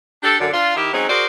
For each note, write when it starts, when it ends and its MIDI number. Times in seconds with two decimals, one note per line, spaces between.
0.23 0.34 62
0.23 0.34 67
0.23 0.34 69
0.40 0.49 42
0.40 0.49 50
0.53 0.73 62
0.53 0.73 65
0.76 0.93 51
0.76 0.93 64
0.76 0.93 67
0.93 1.08 54
0.93 1.08 56
0.93 1.08 60
0.93 1.08 61
0.93 1.08 63
1.09 1.26 66
1.09 1.26 68
1.09 1.26 70
1.09 1.26 72
1.09 1.26 74